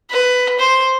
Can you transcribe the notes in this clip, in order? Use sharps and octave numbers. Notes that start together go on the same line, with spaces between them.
B4
C5